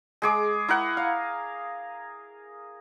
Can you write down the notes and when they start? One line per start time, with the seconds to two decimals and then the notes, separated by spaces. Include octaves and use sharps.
0.22 G#3 G#4 D6
0.68 E4 A#4 F#5
0.97 F5